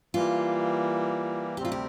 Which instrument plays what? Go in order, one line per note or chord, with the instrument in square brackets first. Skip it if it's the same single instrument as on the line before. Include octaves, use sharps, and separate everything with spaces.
[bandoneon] E3 G3 A#3 [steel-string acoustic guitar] F4
[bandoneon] D2 C3 G3 C4 [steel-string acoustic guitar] G4
[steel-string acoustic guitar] F4
G4